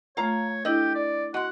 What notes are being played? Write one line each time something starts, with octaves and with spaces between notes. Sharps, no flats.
A3 F4 C#5 F5 A#5
D4 E4 G4 A4 D#5
D5
F#4 D#5 F#5 C6